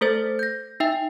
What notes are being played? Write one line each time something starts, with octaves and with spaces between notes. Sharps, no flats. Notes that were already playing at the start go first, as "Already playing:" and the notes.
A3 A4 C5 A6
G6 A#6
D#4 E5 G5